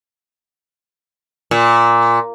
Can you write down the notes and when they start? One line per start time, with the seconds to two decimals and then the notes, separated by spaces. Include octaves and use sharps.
1.51 A#2